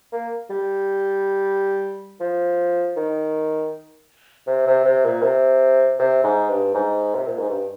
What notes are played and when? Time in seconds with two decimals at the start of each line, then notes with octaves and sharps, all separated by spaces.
0.12 A#3
0.50 G3
2.20 F3
2.96 D#3
4.47 C3
4.67 C3
4.85 C3
5.04 A#2
5.23 C3
5.99 C3
6.23 G#2
6.49 G2
6.74 G#2
7.15 C3
7.27 A#2
7.39 G#2
7.49 G2